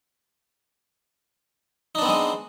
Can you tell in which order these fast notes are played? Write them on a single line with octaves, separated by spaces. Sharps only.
D#4 D4 B3 C4 G#3